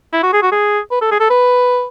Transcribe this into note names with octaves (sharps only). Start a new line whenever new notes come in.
E4
F#4
G#4
F#4
G#4
B4
A4
G#4
A4
B4